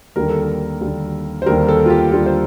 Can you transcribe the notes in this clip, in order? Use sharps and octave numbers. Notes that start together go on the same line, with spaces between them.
D#2 D3 G3 A#4
A4
A#4
D#2 D3 G3
C5
D#2 D3 G3 A#4
A4
F4
G4
D#2 D3 G3 F4
C5